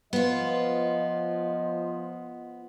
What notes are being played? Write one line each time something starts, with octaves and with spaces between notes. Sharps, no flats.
F3 B3 F4 C5 D#5